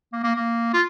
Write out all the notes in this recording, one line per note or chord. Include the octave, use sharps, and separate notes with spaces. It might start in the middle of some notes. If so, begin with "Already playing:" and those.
A#3
A#3
A#3
F4